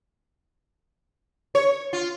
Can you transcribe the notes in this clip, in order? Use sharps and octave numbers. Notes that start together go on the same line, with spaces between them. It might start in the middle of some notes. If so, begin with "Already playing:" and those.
C#5
F4